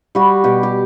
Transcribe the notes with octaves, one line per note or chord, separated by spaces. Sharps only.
G3 F#4
B2 G4
G4